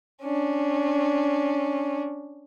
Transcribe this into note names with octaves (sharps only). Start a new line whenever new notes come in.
C#4 D4